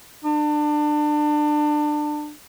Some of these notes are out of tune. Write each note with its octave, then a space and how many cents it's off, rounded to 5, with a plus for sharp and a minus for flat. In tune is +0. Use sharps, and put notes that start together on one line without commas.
D4 +25